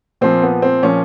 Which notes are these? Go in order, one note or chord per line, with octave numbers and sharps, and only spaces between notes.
A#2 F3 C4
B3
C4
A#2 F3 C#4